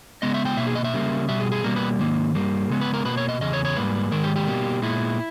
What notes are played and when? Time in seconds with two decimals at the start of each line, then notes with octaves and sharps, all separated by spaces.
0.22 C#3 G#3 B3 D#5
0.34 E5
0.45 G5
0.57 B2 A#3 E5
0.67 G#4
0.75 D#5
0.84 E5
0.94 C#3 G3 A#3
1.28 B2 G3 E5
1.40 G#4
1.52 G#4
1.64 B2 G3 A#3 A#4
1.76 B4
1.99 G#2 D#3 A#3
2.35 G2 G3 A#3
2.69 C#3 G#3 B3
2.81 B4
2.94 A#4
3.05 B2 A#3 B4
3.17 C#5
3.29 D#5
3.41 E2 C#3 D#5
3.53 C#5
3.65 C#5
3.76 G#2 G3 A#3 B4
4.12 G#2 D#3 G#3 A#4
4.23 G4
4.36 G4
4.47 B2 G3 A#3
4.82 A#2 G#3 B3 E4